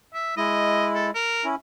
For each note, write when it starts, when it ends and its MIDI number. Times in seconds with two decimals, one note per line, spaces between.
0.14 0.34 76
0.37 1.11 56
0.37 1.11 64
0.37 0.86 75
0.95 1.07 69
1.15 1.44 70
1.44 1.55 61
1.44 1.55 64